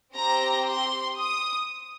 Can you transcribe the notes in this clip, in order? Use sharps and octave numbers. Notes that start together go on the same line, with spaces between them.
C4 G4 A#5
C6
D#6